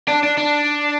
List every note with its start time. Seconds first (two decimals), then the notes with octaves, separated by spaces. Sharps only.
0.08 D4
0.23 D4
0.37 D4